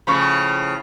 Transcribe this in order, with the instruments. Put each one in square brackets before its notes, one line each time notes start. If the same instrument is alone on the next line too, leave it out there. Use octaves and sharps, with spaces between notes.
[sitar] A2 C#3 F3 [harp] B5 C#6